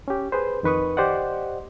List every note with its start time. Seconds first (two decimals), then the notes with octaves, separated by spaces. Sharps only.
0.08 C#4 G4
0.32 G#4 B4 C5
0.63 F2 D#3 B4 C#6 D#6
0.97 G4 C5 D5 D#5 F#5